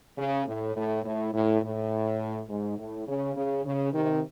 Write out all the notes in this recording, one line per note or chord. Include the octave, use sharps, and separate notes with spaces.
C#3
A2
A2
A2
A2
A2
G#2
A2
C#3
C#3
C#3
C3 D#3